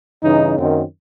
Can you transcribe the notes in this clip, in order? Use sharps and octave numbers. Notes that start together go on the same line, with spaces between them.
G2 C#3 E3 D#4
F#2 D#3 F#3 A#3 C4 C#4